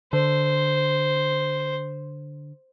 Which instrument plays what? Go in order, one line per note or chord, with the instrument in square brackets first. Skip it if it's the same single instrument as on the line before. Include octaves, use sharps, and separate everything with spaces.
[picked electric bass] D3 [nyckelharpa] C5